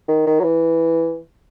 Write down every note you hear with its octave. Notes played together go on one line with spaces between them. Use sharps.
D#3
D#3
F#3
E3